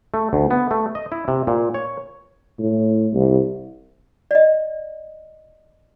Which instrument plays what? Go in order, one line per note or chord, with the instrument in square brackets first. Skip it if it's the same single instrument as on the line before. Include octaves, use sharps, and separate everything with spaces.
[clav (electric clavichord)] A3
D2
B3
A3
D#5
E4
C3
A#2
C#5
[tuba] A2
C2
[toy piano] D5 D#5